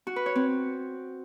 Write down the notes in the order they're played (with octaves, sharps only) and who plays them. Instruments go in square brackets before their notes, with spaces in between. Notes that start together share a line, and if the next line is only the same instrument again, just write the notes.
[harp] F#4
B4
C#5
C4